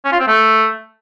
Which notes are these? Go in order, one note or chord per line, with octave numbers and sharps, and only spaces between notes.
C#4
F4
C4
A3